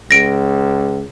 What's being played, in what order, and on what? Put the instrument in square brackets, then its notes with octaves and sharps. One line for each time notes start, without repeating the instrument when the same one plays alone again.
[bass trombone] C#2 [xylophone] A#6 D7